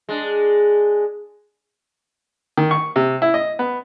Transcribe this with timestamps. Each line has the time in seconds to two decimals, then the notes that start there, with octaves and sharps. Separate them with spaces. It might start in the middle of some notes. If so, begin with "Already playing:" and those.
0.09 G#3 D4
2.57 D#3
2.71 C#6
2.96 C3
3.22 E4
3.34 D#5
3.59 B3